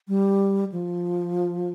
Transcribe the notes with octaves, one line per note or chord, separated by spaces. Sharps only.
G3
F3